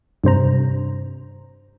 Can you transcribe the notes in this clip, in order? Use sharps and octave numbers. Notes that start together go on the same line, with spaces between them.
G2 C3 C5 A#5